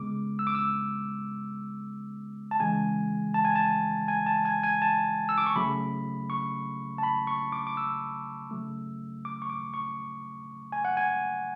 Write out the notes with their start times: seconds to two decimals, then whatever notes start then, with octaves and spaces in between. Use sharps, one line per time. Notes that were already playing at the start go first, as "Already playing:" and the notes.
Already playing: C#3 G#3 B3 D6
0.39 E6
0.47 D6
0.55 E6
2.51 A5
2.60 C#3 E3 G#3 G#5
3.34 A5
3.45 G#5
3.56 A5
4.08 G#5
4.26 A5
4.45 G#5
4.63 G#5
4.82 A5
5.29 E6
5.38 D6
5.46 C#6
5.56 C#3 F#3 A3 B5
6.30 C#6
6.98 A5
7.03 B5
7.27 C#6
7.52 D6
7.67 D6
7.77 E6
8.51 C#3 F#3 A3
9.25 D6
9.42 C#6
9.50 D6
9.74 C#6
10.72 G#5
10.85 F#5
10.97 G#5